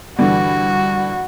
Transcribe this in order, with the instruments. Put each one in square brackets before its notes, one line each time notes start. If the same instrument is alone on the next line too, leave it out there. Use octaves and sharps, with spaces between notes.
[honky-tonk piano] G2 D3 E3 [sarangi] F#4